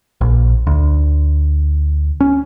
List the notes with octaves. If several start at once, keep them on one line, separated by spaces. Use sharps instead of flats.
A#1
D2
C#4